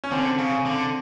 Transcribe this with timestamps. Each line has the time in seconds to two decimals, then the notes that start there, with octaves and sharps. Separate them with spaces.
0.04 C#4
0.11 D3 C4
0.38 C#3
0.65 D3